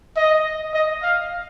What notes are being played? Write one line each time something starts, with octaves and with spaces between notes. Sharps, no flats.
D#5
D#5
F5